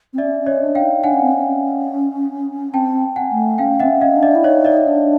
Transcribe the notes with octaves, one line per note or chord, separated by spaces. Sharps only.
C4
C#4 D5 E5
C#4
C#5 D#5
D4
F5 G5
D#4
D4 F#5 G#5
C#4
C4
C#4
C4 G5 A5
F#5 G#5
A3
C#4 F5 G5
C4 E5 F#5
C#4
D#5 F5
D4
D5 E5
E4
D#4 C#5 D#5
D5 E5
D4